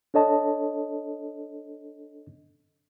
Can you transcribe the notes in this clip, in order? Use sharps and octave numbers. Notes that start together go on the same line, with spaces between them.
D4 A4 C#5 D#5 A5